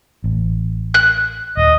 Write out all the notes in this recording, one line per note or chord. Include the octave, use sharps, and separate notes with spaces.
A1
F#6
D#1 D#5